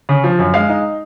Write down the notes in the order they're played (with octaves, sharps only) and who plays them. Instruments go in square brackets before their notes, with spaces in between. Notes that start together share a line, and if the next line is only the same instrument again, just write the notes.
[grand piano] C#3
F3
F#2
G#3 F5
D#4